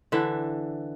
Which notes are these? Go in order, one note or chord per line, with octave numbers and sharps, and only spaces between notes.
D3 E3 D4 E5